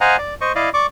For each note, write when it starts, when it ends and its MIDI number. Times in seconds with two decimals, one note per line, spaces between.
0.01 0.17 72
0.01 0.17 75
0.01 0.17 77
0.01 0.17 78
0.01 0.17 80
0.01 0.17 82
0.18 0.34 74
0.41 0.52 72
0.41 0.52 75
0.41 0.52 85
0.55 0.69 64
0.55 0.69 74
0.55 0.69 75
0.55 0.69 77
0.74 0.86 74
0.74 0.86 85
0.74 0.86 86